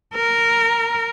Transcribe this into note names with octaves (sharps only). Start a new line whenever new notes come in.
A#4